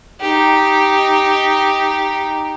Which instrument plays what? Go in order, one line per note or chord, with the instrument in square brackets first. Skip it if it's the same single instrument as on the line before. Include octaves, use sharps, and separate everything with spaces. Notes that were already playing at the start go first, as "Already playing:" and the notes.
[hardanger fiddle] D#4 G4